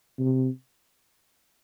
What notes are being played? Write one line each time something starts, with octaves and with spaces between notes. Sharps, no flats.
C3